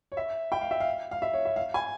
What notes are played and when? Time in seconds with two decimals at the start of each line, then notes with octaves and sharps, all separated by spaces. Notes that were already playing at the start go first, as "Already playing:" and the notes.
0.12 C#5
0.17 E5
0.52 G5
0.61 F5
0.71 E5
0.80 F5
1.11 F5
1.22 E5
1.33 C#5
1.45 E5
1.56 F5
1.74 G#5